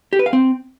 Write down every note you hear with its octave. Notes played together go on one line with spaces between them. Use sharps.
G4
B4
F5
C4